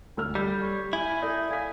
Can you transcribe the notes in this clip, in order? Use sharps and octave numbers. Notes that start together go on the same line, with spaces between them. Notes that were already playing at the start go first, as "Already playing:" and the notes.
D2 E6 F6
G3 G5 G6
C#5
E4 G#5
D#4 A4 D5 E5
F5 G#5 B6